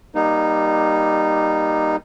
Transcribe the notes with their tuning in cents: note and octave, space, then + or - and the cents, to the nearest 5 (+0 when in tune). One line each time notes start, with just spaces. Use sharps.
G3 +0 A#3 +20 D#4 -10